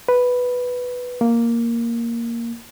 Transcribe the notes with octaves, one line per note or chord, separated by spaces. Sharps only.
B4
A#3